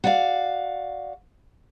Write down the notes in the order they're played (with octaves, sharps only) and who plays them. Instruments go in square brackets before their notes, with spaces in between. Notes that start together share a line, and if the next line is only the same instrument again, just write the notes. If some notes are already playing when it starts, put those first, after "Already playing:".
[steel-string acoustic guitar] F#4 D5 F5